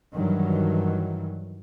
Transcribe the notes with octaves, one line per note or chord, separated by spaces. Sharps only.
G2 D#3 E3 F#3